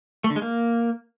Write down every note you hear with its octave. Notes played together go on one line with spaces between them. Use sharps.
A3
D3
G#3
A#3